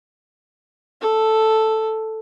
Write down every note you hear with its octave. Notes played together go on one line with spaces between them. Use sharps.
A4